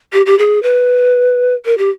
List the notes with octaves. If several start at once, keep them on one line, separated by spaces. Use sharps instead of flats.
G4
G4
G#4
B4
A#4
G4